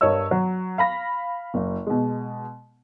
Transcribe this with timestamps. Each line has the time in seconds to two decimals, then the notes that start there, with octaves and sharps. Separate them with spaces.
0.01 G2 A#4 C#5 D#5 E6
0.31 F#3
0.78 F5 B5 A#6
1.54 F#1
1.87 B2 G#3